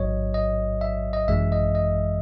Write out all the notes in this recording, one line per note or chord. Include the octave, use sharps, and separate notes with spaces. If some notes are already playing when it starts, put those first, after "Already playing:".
Already playing: A1 G#2 F#3 C#5 D#5
D#5
E5
D#5
G#1 F#2 E3 G#3 E5
D#5
D#5